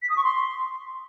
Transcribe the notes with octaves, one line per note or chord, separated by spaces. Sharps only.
B6
D#6
C#6
C6